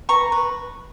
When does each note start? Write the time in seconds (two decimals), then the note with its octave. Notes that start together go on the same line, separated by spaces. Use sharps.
0.09 B4 A#5 C#6
0.32 B4